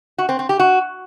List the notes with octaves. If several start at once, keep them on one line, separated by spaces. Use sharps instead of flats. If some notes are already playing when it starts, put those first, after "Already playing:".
F#4
C4
C4
G4
F#4